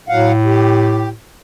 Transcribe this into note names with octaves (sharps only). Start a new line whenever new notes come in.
A2 F#3 F5 F#5
G4